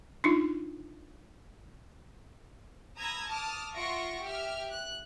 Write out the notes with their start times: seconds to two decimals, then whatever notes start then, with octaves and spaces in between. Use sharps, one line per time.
0.24 D4 D#4 F4
2.99 A#5 B5 D#6 E6 G#6 A#6
3.28 A5 D6 D#6 F6
3.75 F4 E5 F#5 C#6 A#6 D7
4.22 G4 E5 F6
4.71 F#6